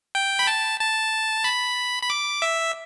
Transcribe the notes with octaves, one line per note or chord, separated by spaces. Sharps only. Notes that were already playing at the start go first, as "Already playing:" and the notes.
G5
B5
A5
A5
B5
B5
D6
E5